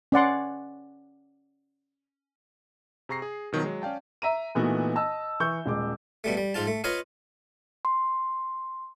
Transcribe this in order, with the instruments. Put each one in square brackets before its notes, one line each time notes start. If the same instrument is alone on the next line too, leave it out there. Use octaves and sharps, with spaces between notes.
[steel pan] C#4 D5 F#5 C6
[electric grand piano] C3 G#4 A#5 C#6 A#6 C7
G#4
B2 D#3 F3 F#3 B3
F#3 G#3
C#4 D5 F5 G5 A5
[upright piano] E5 A#5 D#7
A#2 E3 A3 B3 D#4 F#4
D#5 A5 E6
E3 C#6 G6
D#1 G#3 D6
[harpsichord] B2 G3 A3
G3
G#2 F3 F4 A5
A3
F4 B4 C#5 D#5 F5
[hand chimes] C6